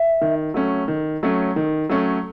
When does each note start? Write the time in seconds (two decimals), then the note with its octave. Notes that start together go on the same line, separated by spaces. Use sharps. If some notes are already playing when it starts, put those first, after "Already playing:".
Already playing: E5
0.21 D#3
0.54 F#3 A3 C#4
0.88 D#3
1.23 F#3 A3 C#4
1.56 D#3
1.89 F#3 A3 C#4